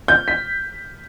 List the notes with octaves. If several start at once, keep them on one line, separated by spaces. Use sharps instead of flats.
G6
B6